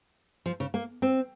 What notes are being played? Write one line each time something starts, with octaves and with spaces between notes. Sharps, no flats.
F3
C#3
A#3
C4